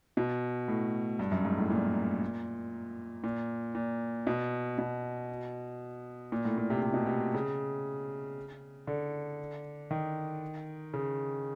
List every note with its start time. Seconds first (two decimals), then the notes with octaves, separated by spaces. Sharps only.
0.17 B2
0.68 A2
1.19 G2
1.31 F#2
1.45 G#2
1.57 A2
1.70 A#2
3.24 A#2
3.75 A#2
4.27 B2
4.78 B2
6.32 A#2
6.45 A2
6.58 A#2
6.70 C3
6.82 C3
6.94 B2
7.06 C3
7.34 C#3
8.87 D3
9.91 D#3
10.94 C#3